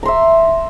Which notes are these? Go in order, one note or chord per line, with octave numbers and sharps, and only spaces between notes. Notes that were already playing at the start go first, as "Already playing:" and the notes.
E5 A#5 C6